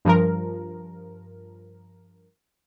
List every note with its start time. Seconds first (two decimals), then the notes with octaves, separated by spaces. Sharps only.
0.05 G2 F3 A#4